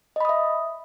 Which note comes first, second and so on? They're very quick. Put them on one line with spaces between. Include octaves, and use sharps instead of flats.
D#5 B5 D#6 E5